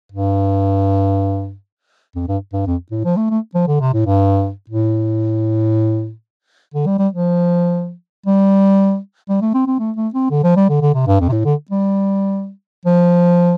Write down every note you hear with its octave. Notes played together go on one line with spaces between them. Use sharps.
G2
F2
G2
G2
F2
A2
F3
A3
A3
F3
D3
C3
A2
G2
A2
D3
G3
G3
F3
G3
G3
A3
C4
C4
A3
A3
C4
D3
F3
G3
D3
D3
C3
G2
F2
C3
A2
D3
G3
F3